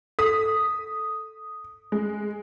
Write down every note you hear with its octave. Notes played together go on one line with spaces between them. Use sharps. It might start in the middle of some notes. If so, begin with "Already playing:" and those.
A4 D#6 B6
G#3